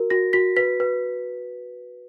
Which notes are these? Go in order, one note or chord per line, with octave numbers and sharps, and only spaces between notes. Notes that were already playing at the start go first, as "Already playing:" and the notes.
Already playing: F#4 A#4
F#4 A#6
F#4 B6
B4 B6
B4